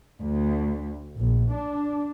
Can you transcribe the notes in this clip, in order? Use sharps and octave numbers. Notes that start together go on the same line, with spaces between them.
D2
A#1
D4